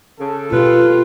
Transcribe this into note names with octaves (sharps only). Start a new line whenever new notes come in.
C#3 A4
B2 F4 G4 B4